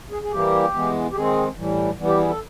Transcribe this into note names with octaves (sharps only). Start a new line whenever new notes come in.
G#4
G#4
E3 G3 A#3 G4
E3 G#3 B3
G4
D#3 G#3 C4 G#4
A2 E3 G3
E3 G3 B3
G4
G#4
A4